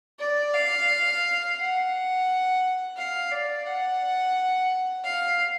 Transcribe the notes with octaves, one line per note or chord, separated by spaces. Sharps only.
D5
F5
F#5
F5
D5
F#5
F5